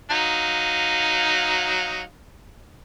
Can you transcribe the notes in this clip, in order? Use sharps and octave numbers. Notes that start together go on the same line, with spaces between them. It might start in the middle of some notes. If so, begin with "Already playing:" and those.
F#3 D#4 F5